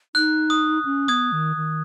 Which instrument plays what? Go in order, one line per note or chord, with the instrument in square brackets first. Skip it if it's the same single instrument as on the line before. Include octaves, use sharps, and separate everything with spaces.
[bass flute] D#4 [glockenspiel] F#6
[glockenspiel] D#6
[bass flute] C#4
[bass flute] B3 [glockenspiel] D#6 G#6
[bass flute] D#3
D#3